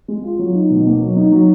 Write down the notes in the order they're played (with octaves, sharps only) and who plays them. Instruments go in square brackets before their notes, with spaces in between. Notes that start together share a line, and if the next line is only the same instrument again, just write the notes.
[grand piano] G#3
F4
F#3
D#4
B2
A#3
F#3
D#4
F#3